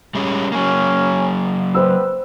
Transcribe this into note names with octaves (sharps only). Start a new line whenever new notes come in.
G3 G#3 C#4
F#3 A#3 C#4
B3 C4 B4 C5 E6